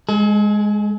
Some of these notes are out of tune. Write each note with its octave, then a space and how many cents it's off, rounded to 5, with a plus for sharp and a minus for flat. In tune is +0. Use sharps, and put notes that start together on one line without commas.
G#3 +0 A4 -45